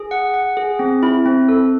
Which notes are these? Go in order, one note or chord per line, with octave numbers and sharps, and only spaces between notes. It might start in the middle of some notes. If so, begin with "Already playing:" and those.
Already playing: G#4
F#5
F#5
G#4
C4
E4
C4
A4